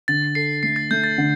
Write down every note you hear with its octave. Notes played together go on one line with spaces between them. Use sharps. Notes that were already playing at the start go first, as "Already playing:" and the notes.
D3 A6
A4 C7
A3 C7
A6
A3 G6
A6
D3